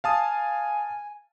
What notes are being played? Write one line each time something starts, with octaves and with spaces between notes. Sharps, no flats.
F5 G#5 A5 D#6